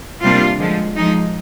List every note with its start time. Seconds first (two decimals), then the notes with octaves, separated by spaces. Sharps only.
0.23 C3 G3 A#3 D4 F4
0.59 D3 F3 G#3
0.95 F3 G#3 D#4